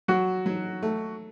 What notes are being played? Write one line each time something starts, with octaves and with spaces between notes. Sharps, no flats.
F#3 F#4
F#3
A3